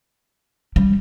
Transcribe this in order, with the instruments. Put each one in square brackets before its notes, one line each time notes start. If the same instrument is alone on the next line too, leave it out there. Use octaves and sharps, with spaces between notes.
[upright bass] G3